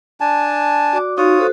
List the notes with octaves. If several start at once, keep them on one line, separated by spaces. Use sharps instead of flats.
D4 G#5 A5
F#4 D5 D6
D#4 F4 F#4 C#5 D#6
F#4 A4 C5